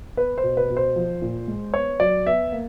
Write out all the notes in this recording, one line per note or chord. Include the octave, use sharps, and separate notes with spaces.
B3 B4
C5
B2
B4
B2
C5
F3
A#2
G#3
B3 C#5
F#3 D5
B3 E5
A#3